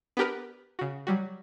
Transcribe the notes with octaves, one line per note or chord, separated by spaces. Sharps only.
B3 D4 G4 A#4 B4
C#3 F#4
F#3 G3 F#4